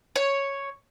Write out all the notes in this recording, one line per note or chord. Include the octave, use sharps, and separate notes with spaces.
C#5